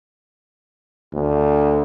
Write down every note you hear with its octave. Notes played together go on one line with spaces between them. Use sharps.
D2